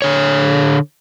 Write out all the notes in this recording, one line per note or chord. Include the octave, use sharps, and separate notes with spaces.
D3 C#5